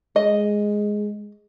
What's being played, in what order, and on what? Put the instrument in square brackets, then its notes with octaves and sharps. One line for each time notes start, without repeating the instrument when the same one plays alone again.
[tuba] G#3 [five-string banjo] D#5